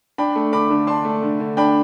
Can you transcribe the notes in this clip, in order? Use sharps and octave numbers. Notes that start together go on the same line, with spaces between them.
D4 G5 B5
A3
D3 B5 D6
D3
D4 A5 C6
A3
D3
D3
D4 G5 B5